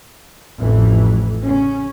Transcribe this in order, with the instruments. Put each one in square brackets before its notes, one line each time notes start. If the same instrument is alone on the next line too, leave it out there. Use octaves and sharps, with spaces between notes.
[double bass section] A1 F2 E3
C#3 C#4